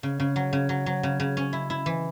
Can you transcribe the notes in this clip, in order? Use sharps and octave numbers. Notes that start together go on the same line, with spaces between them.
C#3
C#3
F#3
C#3
F#3
F#3
C#3
C#3
C#4
E4
E4
E3